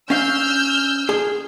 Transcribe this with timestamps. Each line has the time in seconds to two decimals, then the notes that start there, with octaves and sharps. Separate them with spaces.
0.10 C#4 F5 E6 F6 G6
1.09 G#4